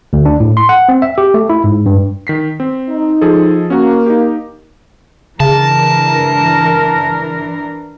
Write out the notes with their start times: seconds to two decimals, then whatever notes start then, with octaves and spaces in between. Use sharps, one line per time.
0.13 D2
0.26 D4
0.40 A2
0.57 C6
0.69 F#5
0.89 C4
1.02 E5
1.18 G4
1.34 A3
1.50 E4
1.64 G#2
1.86 G2
2.27 D#3 B6 C7
2.60 C4
2.89 D#4
3.21 F3 G#4 A4
3.70 A#3 C#4 F#4
4.06 D#4 G4
5.40 C#3 E3 D4 A#4 A5